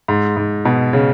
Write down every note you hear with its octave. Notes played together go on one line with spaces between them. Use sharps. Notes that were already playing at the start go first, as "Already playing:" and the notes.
G#2
G#2
B2
C#3